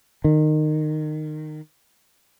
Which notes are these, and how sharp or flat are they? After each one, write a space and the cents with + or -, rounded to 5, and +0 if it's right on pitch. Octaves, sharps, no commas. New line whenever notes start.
D#3 -20